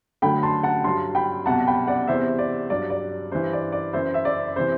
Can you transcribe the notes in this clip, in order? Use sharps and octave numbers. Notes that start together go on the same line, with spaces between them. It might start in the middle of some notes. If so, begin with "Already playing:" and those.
D2 D3 F#3 G5 B5
A5 C6
F#5 A5
G2 F#3 A5 C6
G5 B5
C2 B2 F#3 F#5 A5
G5 B5
D5 F#5
E2 C3 E3 C5 E5
D5
G2 F#3 D5
D5
G2 E3 C5
D5
D5
F#2 E3 C5 E5
E5
D5
C3 E3 C5